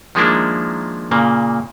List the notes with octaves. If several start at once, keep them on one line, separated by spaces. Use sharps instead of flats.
D#3 F3 G#3 A#3 D4 E4
A#2 C#3 A#3